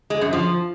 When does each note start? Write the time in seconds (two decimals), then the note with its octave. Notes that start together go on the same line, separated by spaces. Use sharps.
0.10 G#3
0.21 F#2
0.33 F3